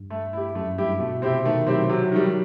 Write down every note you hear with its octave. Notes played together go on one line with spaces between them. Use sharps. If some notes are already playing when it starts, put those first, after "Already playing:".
Already playing: G2
A3
E4 G4
F#2 A3
G2 E4 G4
B2 A3
C3 C4 E4 G4
D#3 A3
F#3 C4 E4 G4
C3 F#3
D#3 G3